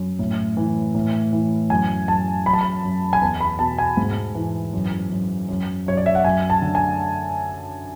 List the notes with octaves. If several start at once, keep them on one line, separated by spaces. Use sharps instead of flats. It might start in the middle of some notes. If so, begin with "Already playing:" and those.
Already playing: F#2
A2
E3
A2
E3
F#2 G#5
F#2 A5
F#2 B5
A5
B5
F#2
G#5
E2 A5
B5
B2 A5
G#5
G#2
E3
F#2
F#2
F#2
F#2 C#5
D5
E5
F#5
F#2 G#5
A5
D3
G#5